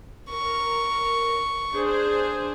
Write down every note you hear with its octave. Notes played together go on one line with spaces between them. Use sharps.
A#4 C#6
D4 G#4 C5